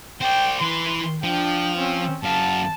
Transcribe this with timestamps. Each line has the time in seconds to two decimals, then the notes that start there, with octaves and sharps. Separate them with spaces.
0.21 C5 D5 G5
0.61 E3 B4 C6
1.23 F3 D4 G5
1.78 C4 C#4
2.23 F#2 F5 A5